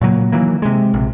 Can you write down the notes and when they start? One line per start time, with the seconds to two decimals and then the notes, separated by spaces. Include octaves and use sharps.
0.01 A#2 C#3 F#3 A#3
0.32 D#3 E3 F#3 A#3
0.62 C3 G#3
0.94 A#1 C3